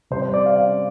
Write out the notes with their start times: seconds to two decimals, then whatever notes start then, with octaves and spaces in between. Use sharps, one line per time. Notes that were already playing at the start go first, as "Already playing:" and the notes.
0.10 C3 G3 C4 C5
0.22 C5
0.34 D5
0.46 F5
0.56 F5